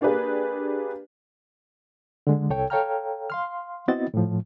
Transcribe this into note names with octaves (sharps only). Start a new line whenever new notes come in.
A#3 D4 G4 G#4 B4
D3 G#3
C2 A4 C#5 G5
A4 C#5 F5 G5 A#5 F6
F5 C6 F6
B3 C4 E4 F#4 D#5 A6
A2 F3